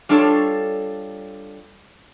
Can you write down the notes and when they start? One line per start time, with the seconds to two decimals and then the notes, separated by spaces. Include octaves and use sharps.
0.09 G3 D4 F4 A4 C#5